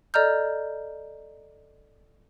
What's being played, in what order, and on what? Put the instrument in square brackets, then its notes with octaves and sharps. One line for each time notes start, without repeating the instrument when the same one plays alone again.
[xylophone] A4 D5 D#5 A#5 F6 G6